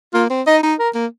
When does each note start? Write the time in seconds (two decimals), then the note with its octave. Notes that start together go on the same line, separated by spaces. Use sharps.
0.14 A#3 F4
0.30 C4
0.47 D#4 D#5
0.63 D#4
0.79 A#4
0.95 A#3